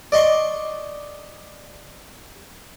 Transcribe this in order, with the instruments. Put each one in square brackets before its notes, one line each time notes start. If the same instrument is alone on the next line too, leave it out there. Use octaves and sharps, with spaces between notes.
[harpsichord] D5 D#5 C6 C#6